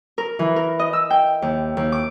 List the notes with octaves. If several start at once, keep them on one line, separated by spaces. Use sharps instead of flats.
A#4
E3
A#4
D#5
E6
G5
D#2
D#2
D6